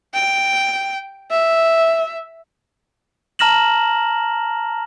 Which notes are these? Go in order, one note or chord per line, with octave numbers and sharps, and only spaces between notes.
G5
E5
A5 A#5 F6 A#6 E7 F#7